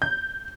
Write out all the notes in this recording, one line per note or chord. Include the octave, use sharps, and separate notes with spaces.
G6